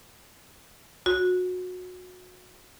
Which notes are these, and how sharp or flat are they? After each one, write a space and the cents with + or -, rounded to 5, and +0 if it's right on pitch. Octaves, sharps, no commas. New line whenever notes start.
F#4 -25